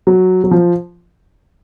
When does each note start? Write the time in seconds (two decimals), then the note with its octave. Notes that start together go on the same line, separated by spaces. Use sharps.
0.07 F#3
0.44 F#3
0.51 F3